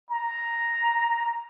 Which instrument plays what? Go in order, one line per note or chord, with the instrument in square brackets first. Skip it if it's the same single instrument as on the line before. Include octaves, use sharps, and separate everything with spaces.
[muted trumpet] A#5